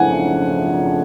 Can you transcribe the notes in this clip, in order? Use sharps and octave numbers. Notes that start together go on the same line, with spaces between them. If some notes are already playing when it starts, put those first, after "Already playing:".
Already playing: F2 C#3 F3 A3 D4 F#5 G#5